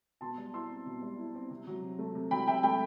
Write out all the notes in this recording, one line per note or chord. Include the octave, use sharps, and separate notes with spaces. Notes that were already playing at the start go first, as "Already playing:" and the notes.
B2 A5 C6
G3
E4 C6 E6
C4
B2
G3
E4
C4
C3
F#3
C3
A3
C3
F#3 G5 B5
C3 E5 G5
A3 G5 B5